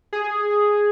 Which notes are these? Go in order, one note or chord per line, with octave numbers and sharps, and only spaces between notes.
G#4